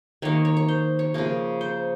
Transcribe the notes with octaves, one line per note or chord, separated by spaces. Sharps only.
D#3 A#3 C#5
C#5
C#5
C5
C#5
C#3 F3 A#3
C5